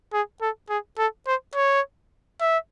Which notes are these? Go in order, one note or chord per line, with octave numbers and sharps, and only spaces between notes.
G#4
A4
G#4
A4
C5
C#5
E5